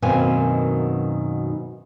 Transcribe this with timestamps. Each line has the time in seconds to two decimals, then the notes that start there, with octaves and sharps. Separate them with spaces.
0.02 F#2 B2 D#3 A#3 C4 G#5